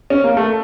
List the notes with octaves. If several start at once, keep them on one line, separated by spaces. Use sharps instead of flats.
C#4
A#3
A3